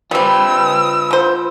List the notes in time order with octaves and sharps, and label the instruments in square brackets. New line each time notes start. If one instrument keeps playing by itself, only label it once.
[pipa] G3 C4 [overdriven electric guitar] F4 B4 [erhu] E6
[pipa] D3 C5